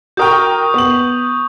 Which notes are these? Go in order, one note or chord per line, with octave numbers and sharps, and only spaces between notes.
F#4 A#4 G5 C#6 D#6 G6
B3 F#7